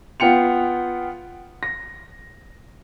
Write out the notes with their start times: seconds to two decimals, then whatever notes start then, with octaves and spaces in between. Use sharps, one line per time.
0.20 B3 F4 G5 C#7 F7
1.63 A#6